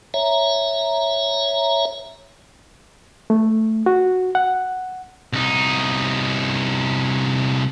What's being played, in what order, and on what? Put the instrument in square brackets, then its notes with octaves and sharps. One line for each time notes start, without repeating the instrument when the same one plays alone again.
[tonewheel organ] C#5 E5 A#5
[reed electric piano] A3
F#4
F#5
[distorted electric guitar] C2 D#4